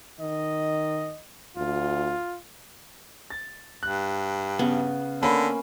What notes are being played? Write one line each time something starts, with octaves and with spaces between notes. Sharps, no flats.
D#3 D#5
D2 F4
A6
G2 F#6
C#3 B3
D3 A#3 C#4 B5